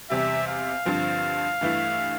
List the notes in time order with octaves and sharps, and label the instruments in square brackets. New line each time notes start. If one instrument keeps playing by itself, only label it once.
[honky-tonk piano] E2 C3 G3 [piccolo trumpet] E5
[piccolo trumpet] F5
[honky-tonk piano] G2 D3 F3 C4
G2 E3 A3 E4